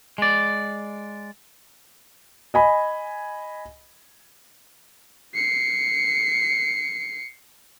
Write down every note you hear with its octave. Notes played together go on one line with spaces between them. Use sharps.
G#3 D5
D#5 G#5 B5
C7 C#7